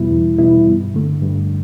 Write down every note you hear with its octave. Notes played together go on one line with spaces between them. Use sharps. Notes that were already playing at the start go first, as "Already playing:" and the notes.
Already playing: E2 B2 G3 B3 E4
E2
B2 G3 B3 E4
G2
D3 A3
G2